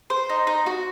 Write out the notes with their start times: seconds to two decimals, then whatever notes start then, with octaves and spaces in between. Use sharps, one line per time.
0.10 C5
0.29 D#4
0.47 D#4
0.66 F#4